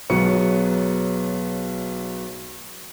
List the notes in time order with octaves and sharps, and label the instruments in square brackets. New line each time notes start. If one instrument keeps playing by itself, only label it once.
[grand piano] B1 F#3 G#3 B3 C#6 C#7